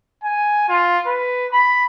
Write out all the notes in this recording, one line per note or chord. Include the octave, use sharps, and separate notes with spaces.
G#5
F4
B4
B5